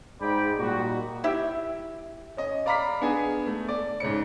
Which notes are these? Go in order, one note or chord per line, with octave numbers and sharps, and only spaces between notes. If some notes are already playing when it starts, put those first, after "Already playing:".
G#2 G#4 D5 G5 B5
A#2 G3 D#4 F#4
E4 G4 E5
C#4 D#5
D5 F5 A#5 B5 D6 B6
B3 D4 G#4 G#5
A3
D5
G#2 C#3 C#4 C#7